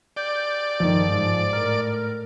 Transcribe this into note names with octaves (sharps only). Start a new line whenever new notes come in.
D5 G6
G1 D#3 F3
G#2
A2 A#4